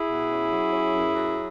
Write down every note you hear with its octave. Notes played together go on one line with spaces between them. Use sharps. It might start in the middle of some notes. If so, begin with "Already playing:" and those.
Already playing: E4 G#4
B2
C#4
F#3
C#4
F#2
F#3